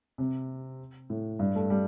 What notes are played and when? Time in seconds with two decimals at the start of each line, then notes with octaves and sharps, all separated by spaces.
0.18 C3
1.10 A2
1.39 G2
1.55 A3
1.70 G3